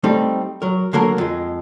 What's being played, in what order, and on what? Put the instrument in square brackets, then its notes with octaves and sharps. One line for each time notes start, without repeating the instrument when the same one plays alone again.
[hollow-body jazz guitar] G3 A3 C4 D#4 A4
F#3 A#4
D3 F#3 A#3 A4 A#4
F2 G#3